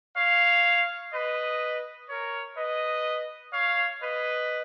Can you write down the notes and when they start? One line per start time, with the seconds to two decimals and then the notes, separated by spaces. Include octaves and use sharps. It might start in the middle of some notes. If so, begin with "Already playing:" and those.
0.17 C#5 F5
1.13 B4 D#5
2.09 A#4 C#5
2.57 B4 D#5
3.53 C#5 F5
4.02 B4 D#5